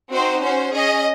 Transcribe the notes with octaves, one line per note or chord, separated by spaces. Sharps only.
C4 D#4 F#4 C5
C#4 F#4 C5
C#4 G#4 D#5